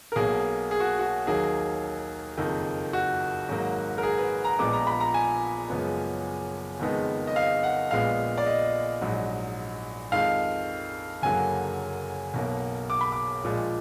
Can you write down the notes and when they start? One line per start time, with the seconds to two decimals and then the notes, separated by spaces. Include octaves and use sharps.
0.12 A#4
0.16 B1 B2 A#3 G#4
0.71 G#4
0.80 F#4
0.99 F#4
1.27 D#2 D#3 F#3 A#3 G#4
2.37 F#1 F2 D#3 A#3
2.93 F#4
3.48 G#1 G#2 F#3 A#3
3.98 A#4
4.03 G#4
4.18 B4
4.44 A#5
4.59 A#1 A#2 F3 G#3 B3 D6
4.73 A#5
4.87 B5
5.00 A#5
5.14 G#5
5.70 F#1 F#2 F3 G#3 B3
6.80 F#1 F2 D#3 G#3 B3
7.27 D#5
7.36 F5
7.63 F#5
7.91 A#1 A#2 G#3 B3 F5
8.38 D5
8.46 D#5
9.01 A#1 G#2 F#3
10.12 F2 D#3 G#3 F5
11.22 F#1 F#2 D3 F#3 A#3 G#5
12.34 B1 B2 A#3
12.90 D6
13.01 B5
13.12 D6
13.44 A#1 A#2 F3 G#3